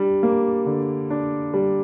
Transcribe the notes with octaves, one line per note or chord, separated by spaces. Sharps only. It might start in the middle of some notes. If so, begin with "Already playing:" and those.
Already playing: G3 D4
A#3
D3
D4
G3